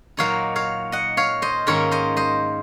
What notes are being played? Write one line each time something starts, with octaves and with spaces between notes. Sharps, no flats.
A#2 F#3 A#3 D#4 C#5 F5
C#5 F5
D#5 F#5
C#5 F5
C5 D#5
G#2 D#3 A#3 C#4 A#4 C#5
C5 D#5
C5 D#5